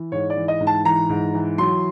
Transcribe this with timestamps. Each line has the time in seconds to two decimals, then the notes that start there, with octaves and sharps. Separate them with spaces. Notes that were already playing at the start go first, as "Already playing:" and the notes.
Already playing: E3
0.12 G#2 C#5
0.30 D5
0.36 E3
0.48 D#5
0.60 G#2
0.67 A5
0.85 E3 A#5
1.09 G#2
1.34 E3
1.58 F#3 C6